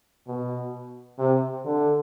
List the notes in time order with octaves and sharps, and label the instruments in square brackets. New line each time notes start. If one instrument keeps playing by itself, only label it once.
[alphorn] B2
C3
D3